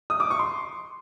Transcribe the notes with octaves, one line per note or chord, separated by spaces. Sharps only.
D#6
D6
C#6
C6